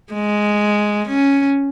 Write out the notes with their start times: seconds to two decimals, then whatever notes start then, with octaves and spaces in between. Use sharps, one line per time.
0.13 G#3
1.08 C#4